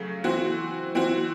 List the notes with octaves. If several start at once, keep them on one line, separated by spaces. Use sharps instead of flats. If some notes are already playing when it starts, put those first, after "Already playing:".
Already playing: C#3 F#3 A3
E3 C4 F#4
E3 C4 F#4